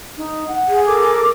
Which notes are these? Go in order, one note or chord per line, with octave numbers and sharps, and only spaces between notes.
D#4
F#5
G#4
A4 A#4 D6